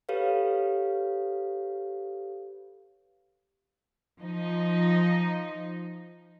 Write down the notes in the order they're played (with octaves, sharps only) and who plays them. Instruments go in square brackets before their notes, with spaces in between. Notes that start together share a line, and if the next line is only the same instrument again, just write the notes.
[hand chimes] G4 A4 B4 C#5 F5
[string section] F3 D#4